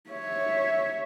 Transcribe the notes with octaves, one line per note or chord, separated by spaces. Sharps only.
C#5 E5